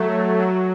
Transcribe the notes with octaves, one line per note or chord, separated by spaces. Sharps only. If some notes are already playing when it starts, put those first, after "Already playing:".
Already playing: F#3 A3
F#3